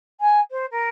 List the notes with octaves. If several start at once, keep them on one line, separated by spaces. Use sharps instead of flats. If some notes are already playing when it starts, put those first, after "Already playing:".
G#5
C5
A#4